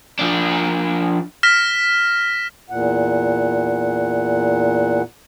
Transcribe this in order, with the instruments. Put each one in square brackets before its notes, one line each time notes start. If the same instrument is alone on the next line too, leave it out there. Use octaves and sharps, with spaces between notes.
[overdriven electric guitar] F3 D4
[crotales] F6 A#6 B6 E7
[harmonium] E2 A#2 F#5